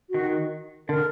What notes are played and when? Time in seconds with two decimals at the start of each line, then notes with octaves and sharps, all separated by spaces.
0.10 D#3 F#4
0.89 D3 A#4